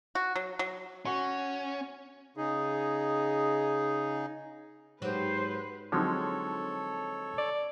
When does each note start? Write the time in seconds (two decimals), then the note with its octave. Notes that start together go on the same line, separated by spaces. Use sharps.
0.15 F#4
0.36 F#3
0.59 F#3
1.06 C#4 F#4 C#6
2.37 C#3 D#4 G#4
5.02 G#2 F#3 G4 B4 C5
5.92 D3 F3 F#3 G#3 C4 D#4 A4 C#5
7.38 D5